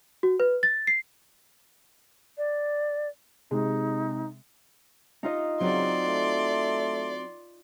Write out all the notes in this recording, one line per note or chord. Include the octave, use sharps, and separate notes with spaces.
F#4
B4
A6
C7
D5
C3 G#3 D#4
D#4 F4 D#5
C#3 F#3 C4 F#4 D5 C6
A3